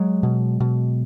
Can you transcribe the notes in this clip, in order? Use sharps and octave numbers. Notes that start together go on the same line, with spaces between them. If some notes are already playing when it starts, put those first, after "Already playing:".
Already playing: F#3 G#3
B2
B2